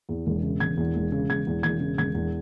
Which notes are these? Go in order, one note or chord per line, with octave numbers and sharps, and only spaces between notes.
E2
E1
C#3
E1 G#6
E2
E1
C#3
E1 G#6
E2
E1 G#6
C#3
E1 G#6
E2